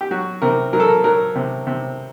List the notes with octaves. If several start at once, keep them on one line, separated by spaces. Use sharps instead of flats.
G4
F#3 F#4
C3 A#4
F#3 A#4
A4
A#4
F#3 A#4
C3
C3